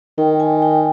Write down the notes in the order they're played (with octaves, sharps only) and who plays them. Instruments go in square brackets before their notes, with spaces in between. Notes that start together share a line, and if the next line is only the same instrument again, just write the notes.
[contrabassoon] D#3 [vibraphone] G5
[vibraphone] G#5
G5